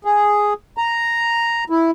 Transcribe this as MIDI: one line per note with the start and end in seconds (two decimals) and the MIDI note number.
0.05 0.53 68
0.78 1.64 82
1.70 1.91 64